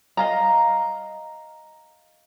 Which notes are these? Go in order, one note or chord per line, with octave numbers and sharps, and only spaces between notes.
D#5 F5 A#5